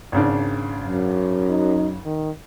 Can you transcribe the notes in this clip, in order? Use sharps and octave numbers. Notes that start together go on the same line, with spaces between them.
G#1 C#3 D4
F#2
D#4
D#3